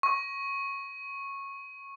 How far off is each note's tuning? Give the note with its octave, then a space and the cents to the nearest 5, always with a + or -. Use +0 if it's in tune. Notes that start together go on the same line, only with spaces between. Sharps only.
C#6 -15